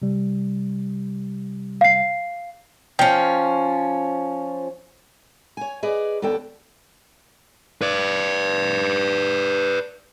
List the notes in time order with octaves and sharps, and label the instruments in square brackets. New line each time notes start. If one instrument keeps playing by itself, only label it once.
[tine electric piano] C3 G3
[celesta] F5 C7
[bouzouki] F3 C#4 [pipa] G5
[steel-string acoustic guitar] C#5 G#5
G#4 B4 D5 D#5
D#2 B3 D4 A4 G5
[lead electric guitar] B4 D5